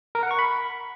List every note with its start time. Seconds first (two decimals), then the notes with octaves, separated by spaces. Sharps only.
0.15 A#4
0.23 F#5
0.31 C#6
0.39 B5